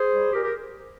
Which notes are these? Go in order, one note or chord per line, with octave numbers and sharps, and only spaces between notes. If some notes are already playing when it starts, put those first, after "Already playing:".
Already playing: G#4 C5
G3
A#2 G4 A#4
G4 A#4